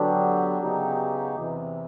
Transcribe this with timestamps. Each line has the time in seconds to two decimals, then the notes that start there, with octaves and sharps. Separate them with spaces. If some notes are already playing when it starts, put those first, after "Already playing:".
Already playing: D3 F#3 B3 D4 G4
0.62 C#3 F#3 B3 D#4 G4
1.35 E2 C3 E3